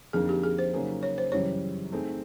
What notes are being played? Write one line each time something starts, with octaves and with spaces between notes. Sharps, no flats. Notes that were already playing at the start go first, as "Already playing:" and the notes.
F2 D3 F3 A#3 D#4 G#4
G4
G#4
C5
C#3 F#3 A#3 D#4 G#4
C#5
C5
F#2 C#3 E3 G3 C#5
A3 C4 D#4 G#4